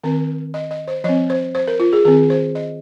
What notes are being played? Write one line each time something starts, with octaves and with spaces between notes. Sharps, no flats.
D#3 C4 A#4
D#5
D#5
C5
F3 C4 D#5
C5
C5
A#4
F4
G#4
D#3 C4 G#4
C5
D#5